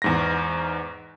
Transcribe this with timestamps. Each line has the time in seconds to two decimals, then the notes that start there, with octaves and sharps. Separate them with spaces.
0.02 E2 G#2 A#6